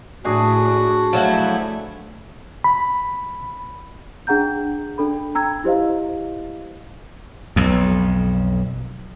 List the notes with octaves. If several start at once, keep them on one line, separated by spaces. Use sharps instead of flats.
A2 D4 F#4 G#4
F3 F#3 A3 E4
B5
D4 G#4 F#5 A#5 G6
D4 A4 B5
G5 A#5 E6 G#6
E4 G4 C5 D#5 F5
B1 F2